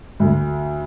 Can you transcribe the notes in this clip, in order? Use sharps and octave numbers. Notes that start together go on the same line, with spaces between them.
D2